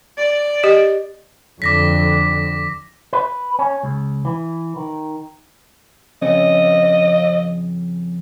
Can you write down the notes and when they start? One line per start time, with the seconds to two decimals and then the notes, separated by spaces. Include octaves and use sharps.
0.18 D5
0.63 G4 D#5
1.62 F2 D3 D6 A#6 B6
3.13 B4
3.59 C#4
3.83 C#2
4.25 E3
4.76 D#3
6.22 F2 C#3 C#4 D#5